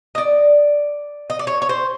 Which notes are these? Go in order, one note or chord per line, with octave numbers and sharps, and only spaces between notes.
D#5
D5
D#5
D5
C#5
C#5
C5